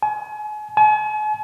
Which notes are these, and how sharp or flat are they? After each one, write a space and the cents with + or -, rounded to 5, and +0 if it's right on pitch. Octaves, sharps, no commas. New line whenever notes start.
G#5 +35
G#5 +45